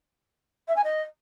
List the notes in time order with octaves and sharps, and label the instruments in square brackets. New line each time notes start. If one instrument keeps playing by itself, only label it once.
[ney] E5
G#5
D#5